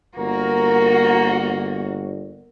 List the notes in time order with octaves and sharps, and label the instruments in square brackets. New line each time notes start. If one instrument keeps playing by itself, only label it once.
[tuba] G1 [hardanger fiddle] A#3 [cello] F#4 [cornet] A#4